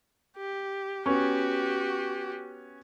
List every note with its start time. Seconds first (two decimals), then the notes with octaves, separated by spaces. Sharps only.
0.37 G4
1.06 B3 C#4 F#4 G4 C#6